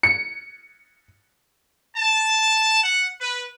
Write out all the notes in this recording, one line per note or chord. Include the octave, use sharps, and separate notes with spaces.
C#7
A5
F#5
B4